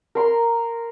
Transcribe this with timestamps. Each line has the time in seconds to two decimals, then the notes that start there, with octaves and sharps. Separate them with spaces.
0.15 A#4 C6